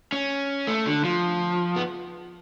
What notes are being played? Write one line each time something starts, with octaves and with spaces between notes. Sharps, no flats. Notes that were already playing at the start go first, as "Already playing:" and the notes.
C#4
A3
D3
F3
B3